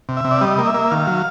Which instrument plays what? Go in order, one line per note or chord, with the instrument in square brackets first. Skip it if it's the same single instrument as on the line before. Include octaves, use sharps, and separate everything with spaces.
[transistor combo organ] C3
E5
C3
D5
G3 D#5
A#3
E5
A#3
D#3 F5
F#3